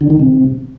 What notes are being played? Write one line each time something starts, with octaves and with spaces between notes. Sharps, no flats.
D3
D#3
C3